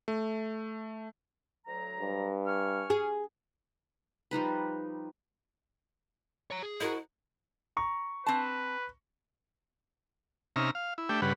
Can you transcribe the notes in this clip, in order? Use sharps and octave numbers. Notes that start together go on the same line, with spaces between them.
A3
D2 F#3 A#5
G2
G#5 C#6 F6
G#4
F3 G3 D#4 B4
C#5 A#5
G#4
E4 F#4 A#4 D#5
A#5 C#6
C4 B4 A5
C3 C#4 D#4 E5 A#5 F6
F5
E4
A3 D4 G4 E5 G5
G2 C#3 G3 B4 F#5